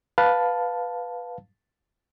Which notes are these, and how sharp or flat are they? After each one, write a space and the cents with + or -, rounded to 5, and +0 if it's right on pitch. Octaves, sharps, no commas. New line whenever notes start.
B4 +0 F5 +15 A5 +0